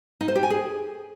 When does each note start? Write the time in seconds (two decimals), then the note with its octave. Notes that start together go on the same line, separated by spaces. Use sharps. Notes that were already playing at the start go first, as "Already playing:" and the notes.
0.21 D#4
0.28 C5
0.36 G4
0.43 G#5
0.50 G#4